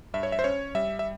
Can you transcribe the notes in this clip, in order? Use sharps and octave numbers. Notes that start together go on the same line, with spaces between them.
G2 E5
C#5
E5
C5
C#4 C#5
G3 E5
E5